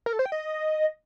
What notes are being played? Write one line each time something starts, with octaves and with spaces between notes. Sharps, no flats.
A#4
A4
C5
G5
D#5